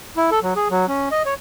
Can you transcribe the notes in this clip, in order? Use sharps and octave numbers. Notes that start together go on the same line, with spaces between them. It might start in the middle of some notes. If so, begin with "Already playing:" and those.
E4
A4
F#3
G#4
F#3
C#4
D#5
C#5